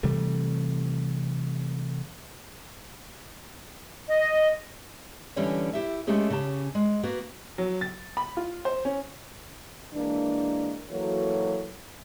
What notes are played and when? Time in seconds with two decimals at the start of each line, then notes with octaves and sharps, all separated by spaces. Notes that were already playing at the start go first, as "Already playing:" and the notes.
0.03 C3 E3 G3 A3
4.07 D#5
5.36 D3 E3 G3 C#4 C#5 F5
5.73 E4 G4 E5
6.07 G#3 A3 B3 C#4 G4 G#4
6.30 C#3 C#4 G4 A5
6.75 G#3
7.03 A#3 B3 F#4 B4
7.58 F#3
7.81 A6
8.17 B5
8.37 F4
8.65 C5
8.85 C#4
9.94 E3 G#3 A#3 D4
10.90 E3 F#3 A#3 F#4 A4 C#5